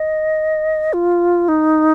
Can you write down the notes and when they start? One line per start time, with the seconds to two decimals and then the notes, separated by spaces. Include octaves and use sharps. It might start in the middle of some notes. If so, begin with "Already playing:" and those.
Already playing: D#5
0.93 F4
1.48 D#4